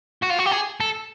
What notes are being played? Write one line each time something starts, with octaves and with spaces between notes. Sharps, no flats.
F#4
F4
F#4
G4
G#4
A4